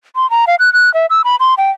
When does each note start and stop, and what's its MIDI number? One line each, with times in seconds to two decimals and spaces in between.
0.16 0.29 84
0.30 0.45 82
0.47 0.55 77
0.59 0.73 90
0.73 0.92 90
0.94 1.06 76
1.10 1.22 88
1.24 1.36 83
1.40 1.54 84
1.58 1.71 79